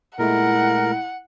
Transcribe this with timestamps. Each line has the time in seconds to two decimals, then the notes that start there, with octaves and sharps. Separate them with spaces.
0.19 A#2 G#3 A3 E4 A#4 F#5